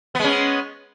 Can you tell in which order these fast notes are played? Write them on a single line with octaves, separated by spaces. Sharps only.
B3 G#3 C#4